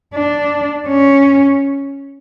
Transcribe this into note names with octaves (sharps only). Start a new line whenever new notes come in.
D4
C#4